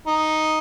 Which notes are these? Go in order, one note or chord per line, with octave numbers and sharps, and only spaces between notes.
D#4